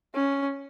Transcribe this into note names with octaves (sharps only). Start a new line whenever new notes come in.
C#4